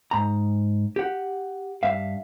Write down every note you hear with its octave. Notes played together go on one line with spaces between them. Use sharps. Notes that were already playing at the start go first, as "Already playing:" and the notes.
G#2 A#5
G4 F#5
G2 E5 F5